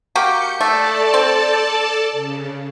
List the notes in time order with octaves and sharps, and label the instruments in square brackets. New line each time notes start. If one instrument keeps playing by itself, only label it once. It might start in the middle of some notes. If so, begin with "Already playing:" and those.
[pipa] A#3 F#4 G4 [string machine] G6 C#7
[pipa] A3 [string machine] A4 D5 A5
[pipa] C4
[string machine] C#3